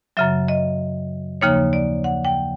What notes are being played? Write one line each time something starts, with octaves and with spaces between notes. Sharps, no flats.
F#2 C#3 F#3 E5
D#5
D#2 C#3 F3 A#3 D#4 C#5
D5
F#5
G5